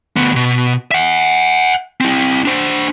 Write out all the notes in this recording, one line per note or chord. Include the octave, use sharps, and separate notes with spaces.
D2 B3
B2
E5 F#5
C4 E4
D4 C5